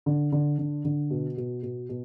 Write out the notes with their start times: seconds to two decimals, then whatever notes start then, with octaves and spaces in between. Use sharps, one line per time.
0.06 D3
0.32 D3
0.58 D3
0.85 D3
1.10 B2
1.37 B2
1.63 B2
1.89 B2